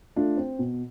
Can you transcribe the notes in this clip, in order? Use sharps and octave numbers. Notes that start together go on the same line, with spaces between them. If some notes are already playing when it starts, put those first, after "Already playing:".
A3 D4 F4
C4
B2